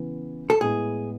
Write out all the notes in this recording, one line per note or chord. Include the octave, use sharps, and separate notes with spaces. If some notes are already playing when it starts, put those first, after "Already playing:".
Already playing: C#3 E3 B3 E4
A4
A2 G#3 B3 E4 G#4